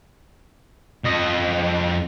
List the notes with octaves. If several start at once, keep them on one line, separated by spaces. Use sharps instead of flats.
F2 D#5